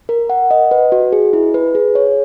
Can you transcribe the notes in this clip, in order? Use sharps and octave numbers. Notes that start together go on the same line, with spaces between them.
A#4
F#5
D#5
B4
F#4
G#4
E4
B4
G#4
C#5